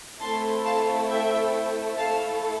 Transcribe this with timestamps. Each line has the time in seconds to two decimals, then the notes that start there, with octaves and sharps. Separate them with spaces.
0.21 A3 C4 E4 A4 A5 C6
0.65 F5 A5
1.09 E5 G5
1.98 A3 E4 A4 F5 A5